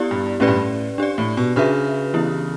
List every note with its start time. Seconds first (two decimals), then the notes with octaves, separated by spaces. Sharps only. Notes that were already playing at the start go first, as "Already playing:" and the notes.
Already playing: B3 E4 G4 D5
0.11 G2
0.40 A2 C#4 G4 B4 D5
0.48 G2
0.55 A2
0.98 D4 G4 D5
1.18 A2
1.37 B2
1.56 C#3 D4 F#4 B4 E5
2.14 E3 B3 E4 G4